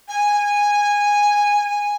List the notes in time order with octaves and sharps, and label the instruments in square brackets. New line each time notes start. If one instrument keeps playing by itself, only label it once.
[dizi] G#5